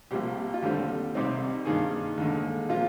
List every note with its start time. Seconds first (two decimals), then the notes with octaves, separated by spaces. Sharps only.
0.11 C2 C3 F3 A#3 G4
0.54 F4
0.62 D#2 D3 G3 C4 G4
1.14 C2 C3 G3 C4 D#4
1.65 G2 D#3 A#3 D#4 G#4
2.17 D#2 D3 G#3
2.69 A#2 F3 A#3 F4